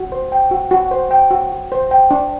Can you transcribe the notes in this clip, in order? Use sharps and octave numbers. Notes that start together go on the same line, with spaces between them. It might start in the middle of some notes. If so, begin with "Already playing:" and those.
Already playing: F#4
C5
G5
F#4
F#4
C5
G5
F#4
F#4
C5
G5
D4